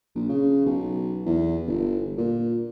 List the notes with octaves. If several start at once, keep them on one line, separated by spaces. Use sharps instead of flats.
A#1
C#3
B1
E2
G1
A#2